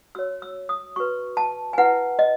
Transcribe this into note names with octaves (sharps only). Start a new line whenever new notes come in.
F#4 C#5 E6
E6
D#6
F#4 B4 C#6
A5
G#5
E4 B4 F#5
D#5